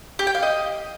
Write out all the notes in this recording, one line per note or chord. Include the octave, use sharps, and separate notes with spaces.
G4
G5
F5
D#5